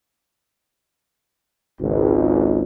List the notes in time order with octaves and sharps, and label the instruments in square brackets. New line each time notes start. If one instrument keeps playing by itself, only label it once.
[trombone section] G#1 C#2